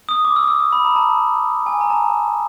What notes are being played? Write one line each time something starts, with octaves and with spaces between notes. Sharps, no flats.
D#6
D6
E6
D#6
E6
D#6
B5
A#5
A5
G#5
A#5
A5